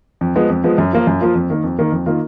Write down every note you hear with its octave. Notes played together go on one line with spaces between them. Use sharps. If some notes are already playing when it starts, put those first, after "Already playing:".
F2
F3 G#3 B3
F2
F3 G#3 B3
F#2
F3 A#3 F4
F#2
F3 A#3 F4
F2
D#3 A#3
F2
D#3 A#3
F2
D#3 A#3 F4